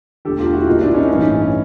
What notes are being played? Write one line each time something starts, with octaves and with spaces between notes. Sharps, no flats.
E1 D2 D3 G4 A4
F4 G4
E4 F#4
C2 A#2 D#4 F4
D4 E4
C#4 D#4
A1 G2 E3 C#4 D#4